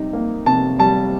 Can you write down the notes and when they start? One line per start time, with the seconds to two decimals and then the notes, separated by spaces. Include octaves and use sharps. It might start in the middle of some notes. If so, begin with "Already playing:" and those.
Already playing: C3 G3 D#4
0.13 A#3
0.46 C3 A5
0.79 G3 A5